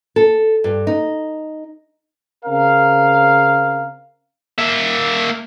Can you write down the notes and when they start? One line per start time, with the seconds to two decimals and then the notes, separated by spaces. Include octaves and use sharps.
0.16 A4
0.64 G2
0.87 D#4
2.45 C#3 C4 A#4 F5
4.59 A#3 E5